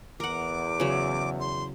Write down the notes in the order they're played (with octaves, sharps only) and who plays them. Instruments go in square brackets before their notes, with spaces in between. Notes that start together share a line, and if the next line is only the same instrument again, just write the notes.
[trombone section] E2 [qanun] A#4 F#5 [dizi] D6
[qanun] C#3 F#3
[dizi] C6